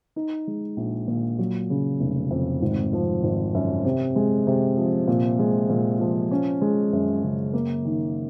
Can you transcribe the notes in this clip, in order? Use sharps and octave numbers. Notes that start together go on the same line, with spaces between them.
D#4
G#3
A#1
A#2
F#3
C#3
F1
F2
G#1
F3
G#1
F#2
C3
G#3
C3
F3
A#2
G#3
A#2
F3
C#4
G#3
F#2
C#3
A#3
D#3